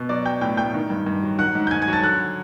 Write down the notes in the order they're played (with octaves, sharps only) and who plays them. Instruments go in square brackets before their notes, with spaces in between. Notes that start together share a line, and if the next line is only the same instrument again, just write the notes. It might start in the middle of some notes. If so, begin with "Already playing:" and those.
Already playing: [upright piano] B2
F#3 D5 D6
F#3 G5 G6
A2 G5 G6
A2 G5 G6
D#3
G2
G2
F#3
D#3 F#5 F#6
G#2
G6
G#2 G#5 G#6
G#5 G#6
F#3
A5 A6
D3 F#5 F#6